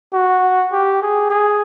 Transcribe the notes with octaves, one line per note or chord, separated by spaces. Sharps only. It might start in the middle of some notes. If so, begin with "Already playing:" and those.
F#4
G4
G#4
G#4